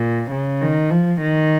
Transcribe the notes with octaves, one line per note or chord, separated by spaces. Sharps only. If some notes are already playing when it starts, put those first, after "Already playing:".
Already playing: A#2
C#3
D#3
F3
D#3